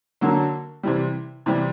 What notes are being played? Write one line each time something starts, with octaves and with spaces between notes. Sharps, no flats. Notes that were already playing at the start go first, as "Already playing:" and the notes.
D3 F#3 A#3
C3 E3 G3
C3 E3 G3